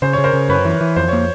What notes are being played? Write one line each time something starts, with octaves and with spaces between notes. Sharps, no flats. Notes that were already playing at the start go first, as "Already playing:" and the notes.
C#3 C5
C#3 C#5
A#4 C5
C#3
F#2 B4 C#5
E3
E3
F2 C5
A#3 C#5